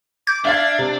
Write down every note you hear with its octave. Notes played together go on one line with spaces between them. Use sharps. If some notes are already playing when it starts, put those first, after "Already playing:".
D6 G6
D4 E5 F5 G#6 A6
C3